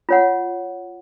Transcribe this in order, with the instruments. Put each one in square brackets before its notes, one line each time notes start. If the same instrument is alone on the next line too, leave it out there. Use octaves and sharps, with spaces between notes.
[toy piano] F4 C#5 F#5